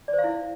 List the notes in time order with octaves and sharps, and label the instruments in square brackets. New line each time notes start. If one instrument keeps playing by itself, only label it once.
[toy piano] D5
C5
F5
E4